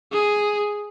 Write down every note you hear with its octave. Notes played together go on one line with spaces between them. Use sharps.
G#4